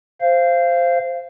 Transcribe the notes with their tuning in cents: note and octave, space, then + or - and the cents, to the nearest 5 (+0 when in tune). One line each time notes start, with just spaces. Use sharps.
C5 +0 F5 -20